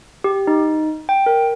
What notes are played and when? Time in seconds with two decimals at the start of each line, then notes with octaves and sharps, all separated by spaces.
0.24 G4
0.47 D#4
1.09 G5
1.26 A#4